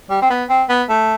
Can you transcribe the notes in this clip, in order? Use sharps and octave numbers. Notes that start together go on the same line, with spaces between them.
G3
C4
B3
C4
B3
A3